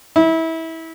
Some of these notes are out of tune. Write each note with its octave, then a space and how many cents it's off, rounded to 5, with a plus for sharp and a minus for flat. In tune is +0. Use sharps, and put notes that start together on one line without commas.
E4 -25